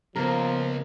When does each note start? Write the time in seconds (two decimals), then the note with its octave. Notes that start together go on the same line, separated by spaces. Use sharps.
0.16 C#2 F3 A#3 B3 A#4